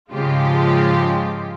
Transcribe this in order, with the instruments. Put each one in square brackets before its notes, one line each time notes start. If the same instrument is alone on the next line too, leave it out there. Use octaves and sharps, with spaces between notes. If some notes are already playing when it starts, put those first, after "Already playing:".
[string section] G#2 C#3 F3 G#3 F4 G4